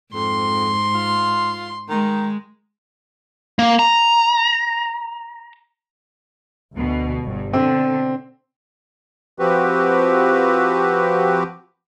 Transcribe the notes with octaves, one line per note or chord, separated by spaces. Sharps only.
F2 G#2 C6
F4
D#3 G#3
A#3
A#5
D2 B2
G1 G2
B2 D3 C4
F3 C4 F#4 G4 B4